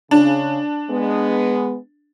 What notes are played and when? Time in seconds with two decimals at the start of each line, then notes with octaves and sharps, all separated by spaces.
0.11 C#3 D4
0.90 G#3 B3